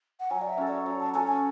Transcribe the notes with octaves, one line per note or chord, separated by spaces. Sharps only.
F#5
F#3 G#5
D5
E5
C#4 F#4 A4
D5
F#3 C#5
A5
C#4 F#4 A4 G#5
G#5